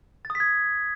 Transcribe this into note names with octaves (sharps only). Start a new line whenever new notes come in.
A6
D#6
B6
G#6